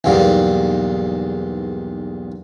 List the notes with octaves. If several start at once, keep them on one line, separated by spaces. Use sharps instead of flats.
B1 E2 G#2 G3 A#3